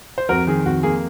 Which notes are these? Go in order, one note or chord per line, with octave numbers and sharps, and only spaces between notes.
C5
F2 F#4 A#4
D#3 G#4
F2 F#4
A#3 G#4